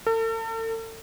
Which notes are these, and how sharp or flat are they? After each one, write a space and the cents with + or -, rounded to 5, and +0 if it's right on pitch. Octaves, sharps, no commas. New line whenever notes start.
A4 +40